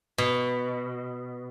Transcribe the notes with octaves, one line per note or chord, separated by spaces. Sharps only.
B2